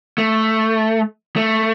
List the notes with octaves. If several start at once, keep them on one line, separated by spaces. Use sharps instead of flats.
A3
A3